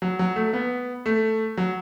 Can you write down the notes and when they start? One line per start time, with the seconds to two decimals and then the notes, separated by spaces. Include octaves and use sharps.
0.02 F#3
0.19 F#3
0.36 A3
0.53 B3
1.06 A3
1.57 F#3